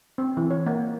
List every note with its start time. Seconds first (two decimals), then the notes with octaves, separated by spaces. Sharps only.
0.18 C4
0.37 E3
0.50 C#5
0.66 A#3